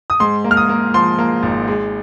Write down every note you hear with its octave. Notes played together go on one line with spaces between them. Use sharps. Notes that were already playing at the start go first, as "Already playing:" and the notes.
D#6
G#2 C6
A#3
F6
D#6
A#3
F3 C6
A#3
G#1
G#3